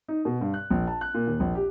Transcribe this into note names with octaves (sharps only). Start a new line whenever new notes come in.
D#4
B2
G2
F#6
A#1
A5
F#6
A#2
D#2
A#1
G4